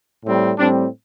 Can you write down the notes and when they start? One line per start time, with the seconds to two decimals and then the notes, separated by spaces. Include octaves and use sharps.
0.24 A2 G3 C4
0.59 A2 G3 C4 D4